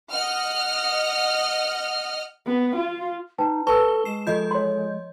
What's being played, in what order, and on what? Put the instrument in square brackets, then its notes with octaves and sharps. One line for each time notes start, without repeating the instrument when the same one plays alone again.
[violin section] D#5 F#5 F6
[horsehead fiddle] B3
F4
[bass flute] D#4 [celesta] B4 G5 A5
[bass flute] A4 [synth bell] B4 G7 [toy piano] A5 E6 [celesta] C#6
[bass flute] G#3 [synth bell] C7 E7
[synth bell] F3 D#5 G6 [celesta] F4 A4
[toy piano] C#5 C6